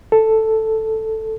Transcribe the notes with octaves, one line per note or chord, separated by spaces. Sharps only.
A4